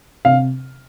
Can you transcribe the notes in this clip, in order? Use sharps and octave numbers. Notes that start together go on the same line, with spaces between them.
C3 F5